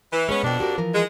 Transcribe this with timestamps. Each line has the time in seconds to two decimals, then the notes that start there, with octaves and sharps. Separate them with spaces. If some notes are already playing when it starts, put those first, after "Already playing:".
0.12 E3
0.29 G#3 B3 C#4 B4
0.43 F2 B2 D4 G5
0.60 F#4 G4 A#4
0.78 E3 F3 A#4
0.93 G#3